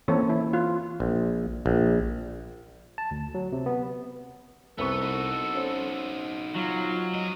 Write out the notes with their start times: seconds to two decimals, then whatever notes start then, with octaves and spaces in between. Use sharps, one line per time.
0.08 E3 A#3 C4 C#4 A4 C#5
0.30 E4
0.53 F4
1.00 A#1
1.66 A#1
2.98 A5
3.11 D2
3.35 F#3
3.52 C3
3.66 B3
4.78 C2 B3 C4 A4 C#6
5.02 D#4 F#4
5.55 C#4 C5
6.56 F#3 F4
7.14 G#2 D#5